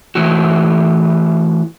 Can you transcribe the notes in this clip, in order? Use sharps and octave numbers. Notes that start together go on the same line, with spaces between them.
E3 A3 E4 F#4